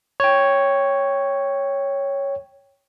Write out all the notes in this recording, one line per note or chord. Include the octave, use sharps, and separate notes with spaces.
C#5 G5